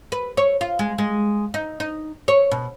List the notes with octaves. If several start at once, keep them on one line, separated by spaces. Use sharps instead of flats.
B4
C#5
F4
G#3
G#3
D#4
D#4
C#5
B2